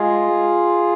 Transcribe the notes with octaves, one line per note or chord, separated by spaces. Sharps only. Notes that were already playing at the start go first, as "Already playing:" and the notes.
Already playing: G#3 F4 G#4